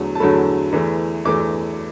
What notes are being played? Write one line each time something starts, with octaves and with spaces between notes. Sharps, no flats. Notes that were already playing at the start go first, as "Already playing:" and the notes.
Already playing: E2 D3 F#3 A3
A5
E2 D3 F#3 A3 B5
E2 E3 A3
E2 E3 A3 D6